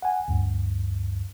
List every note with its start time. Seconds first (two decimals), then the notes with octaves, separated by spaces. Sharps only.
0.02 F#5 G#5
0.28 D2 G2